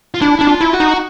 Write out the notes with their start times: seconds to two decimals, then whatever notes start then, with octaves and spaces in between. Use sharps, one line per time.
0.14 F4
0.21 D4 E4
0.39 D4 E4
0.48 F4
0.61 E4
0.73 F#4
0.80 D#4